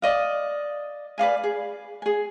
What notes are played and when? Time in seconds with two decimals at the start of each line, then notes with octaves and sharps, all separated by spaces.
0.02 D5 D#5 F5
1.18 B4 D5 F5 G#5
1.44 G#4
2.02 G#4 G#5